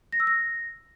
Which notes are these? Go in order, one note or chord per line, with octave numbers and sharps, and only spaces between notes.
A#6
E6
A#6